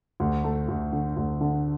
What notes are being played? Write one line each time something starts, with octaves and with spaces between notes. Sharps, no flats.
D2
A3
D2
D3
D2
D3